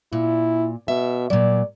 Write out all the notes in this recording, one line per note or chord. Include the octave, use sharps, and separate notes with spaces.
A#2 E4
B2 E5
A#2 F#3 D5